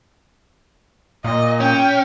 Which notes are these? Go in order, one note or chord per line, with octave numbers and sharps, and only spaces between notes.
A#2 D#5
C#4 G5